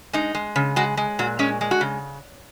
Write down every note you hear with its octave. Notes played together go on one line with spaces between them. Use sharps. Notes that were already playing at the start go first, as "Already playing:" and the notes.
G#3 D#4
G#3
C#3
G#3 F#4
G#3
A#2 F#4
G#3 C#4
G#3
F#4
C#3